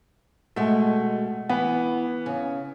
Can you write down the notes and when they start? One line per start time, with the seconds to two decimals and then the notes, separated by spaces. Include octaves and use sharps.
0.56 B2 G#3 A3
1.49 E3 B3
2.26 C#3